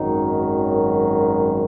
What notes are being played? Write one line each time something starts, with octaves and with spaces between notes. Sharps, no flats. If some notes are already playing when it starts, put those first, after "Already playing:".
Already playing: G#1 F#2 D#3 F#3 D#4